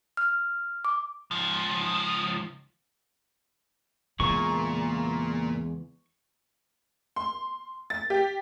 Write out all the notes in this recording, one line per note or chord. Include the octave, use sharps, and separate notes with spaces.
F6
D6
C#2 F3
E2 A#2 C#3 G#3 C#6
C6
A6
G4